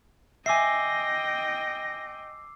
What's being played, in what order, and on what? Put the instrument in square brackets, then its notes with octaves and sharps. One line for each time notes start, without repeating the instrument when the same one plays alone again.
[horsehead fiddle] D#5 G5 [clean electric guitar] E5 G#5 [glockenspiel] D6 E6 C7 [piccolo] A#6